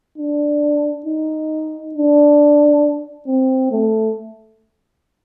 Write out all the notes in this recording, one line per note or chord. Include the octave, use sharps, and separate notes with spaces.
D4
D#4
D4
C4
A3